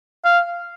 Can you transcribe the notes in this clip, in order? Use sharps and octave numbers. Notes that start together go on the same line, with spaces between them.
F5